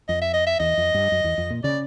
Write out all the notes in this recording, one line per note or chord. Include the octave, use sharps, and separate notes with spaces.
F2 D#5
E5
D#5
E5
E2 D#5
F2
G2
F#2
E2
F2
A#2
C#3 D5